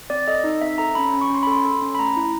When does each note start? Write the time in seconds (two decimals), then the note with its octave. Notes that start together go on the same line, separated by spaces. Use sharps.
0.10 C4 D5
0.27 A4 D#5
0.44 D#4
0.61 C4 E5
0.78 A4 A#5
0.95 C#4 B5
1.14 C#4
1.21 C#6
1.30 C#4 C6
1.43 B5
1.47 A4 C6
1.65 A4
1.82 C#4
1.95 B5
1.99 A3 A#5
2.17 E4